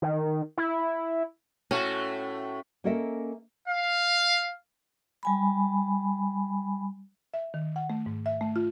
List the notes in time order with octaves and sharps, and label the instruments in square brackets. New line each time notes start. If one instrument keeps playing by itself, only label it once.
[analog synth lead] D#3
E4
[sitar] A2 A3 F#4 [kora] C#4
[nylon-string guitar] A#3 C#4 A4 A#4 D#5 E5
[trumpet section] F5
[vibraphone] G3 G#5 B5
[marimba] E5
D#3
F#5
A3
G#2
E5
A3
F4